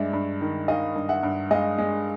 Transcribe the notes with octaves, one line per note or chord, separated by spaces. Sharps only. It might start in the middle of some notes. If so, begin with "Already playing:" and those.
Already playing: G2 G#3 D5 E5
G2
D#3
D#3 D#5 F5
G2
E5 F#5
G2
G#3 D#5 F5
G#3